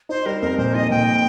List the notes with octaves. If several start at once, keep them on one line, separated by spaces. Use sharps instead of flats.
D#4 C5
G3 A#4
F2 A#4
A#2 C5
D#4 D#5
A#2 G5